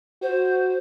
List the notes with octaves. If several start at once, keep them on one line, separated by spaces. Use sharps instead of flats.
F#4 C5